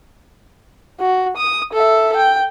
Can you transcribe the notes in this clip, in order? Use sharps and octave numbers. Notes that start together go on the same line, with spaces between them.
F#4
D#6
A4 E5
G5